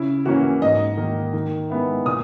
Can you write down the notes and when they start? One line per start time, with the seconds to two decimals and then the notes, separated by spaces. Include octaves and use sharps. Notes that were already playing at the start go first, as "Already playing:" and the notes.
Already playing: C#3 E4
0.25 E3 A#3 C#4 F#4
0.62 G#2 D#5
0.97 D#3 A#3
1.33 D#3
1.70 G#3 B3 E4
2.06 A#2 D#6